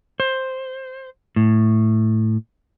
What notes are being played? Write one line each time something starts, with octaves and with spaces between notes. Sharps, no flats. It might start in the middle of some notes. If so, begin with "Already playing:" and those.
C5
A2